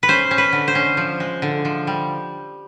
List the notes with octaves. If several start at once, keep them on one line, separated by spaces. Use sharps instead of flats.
B4
C#4 C5
C#4
B4
D3
C5
C#4
F3
G#3
D3
F3
G3